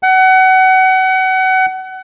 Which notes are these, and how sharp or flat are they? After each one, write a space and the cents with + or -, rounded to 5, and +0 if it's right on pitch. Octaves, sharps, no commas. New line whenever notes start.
F#5 +30